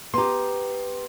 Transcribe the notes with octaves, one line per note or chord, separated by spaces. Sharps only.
B3 G4 A#5 C6